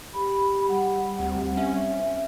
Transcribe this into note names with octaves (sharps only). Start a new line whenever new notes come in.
G4 B5
G3 F#5
D2 C4
C#4 E5